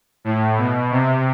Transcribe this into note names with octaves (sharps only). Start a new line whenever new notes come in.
A2
B2
C3